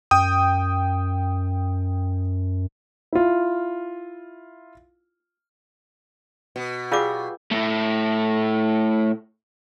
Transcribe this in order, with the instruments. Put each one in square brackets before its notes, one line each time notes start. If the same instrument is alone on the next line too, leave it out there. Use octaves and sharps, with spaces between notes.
[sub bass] F#2 [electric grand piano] G5 D#6
[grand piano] E4 F4
[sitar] B2
[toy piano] F4 D6 [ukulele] G4 G#4 D5 [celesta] F5 E6 G6
[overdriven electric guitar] A2 A3